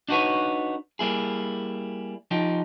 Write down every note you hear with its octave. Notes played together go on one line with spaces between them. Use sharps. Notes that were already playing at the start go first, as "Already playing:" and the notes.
D4 D#4 F#4 G4 B4 C#5
G3 A#3 E4 G#4
F3 D#4 G4